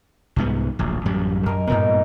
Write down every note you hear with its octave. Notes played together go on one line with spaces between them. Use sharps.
C2 G#2 B3
D1 A#1
A1 F#2 G3
F#2 A#4 D#5 G#5
G2 A#2 B3 D#4 A#4